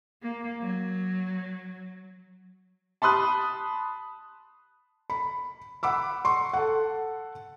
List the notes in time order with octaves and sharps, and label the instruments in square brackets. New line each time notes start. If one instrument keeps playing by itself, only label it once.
[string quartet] A#3
F#3
[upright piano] A5 B5 C6 D#6 F#6
[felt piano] B5
F#5 B5 D6 E6
C6 C#6
A4 F#5